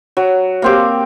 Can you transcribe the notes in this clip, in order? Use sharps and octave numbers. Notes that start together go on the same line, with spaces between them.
F#3
A#3 C4 G4